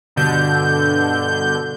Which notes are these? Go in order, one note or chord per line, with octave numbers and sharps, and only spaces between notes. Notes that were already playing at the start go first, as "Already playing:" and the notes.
G2 B2 D3 G6